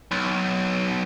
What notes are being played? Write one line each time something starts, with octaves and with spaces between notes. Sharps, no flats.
B1